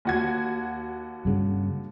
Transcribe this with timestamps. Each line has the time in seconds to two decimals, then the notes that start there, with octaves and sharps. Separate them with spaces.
0.05 D#2 F#4 G#6
1.25 G2 C#3